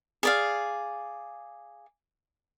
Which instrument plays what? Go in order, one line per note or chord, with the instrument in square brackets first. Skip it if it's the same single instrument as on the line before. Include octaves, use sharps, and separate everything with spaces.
[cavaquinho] G#4 D5 F5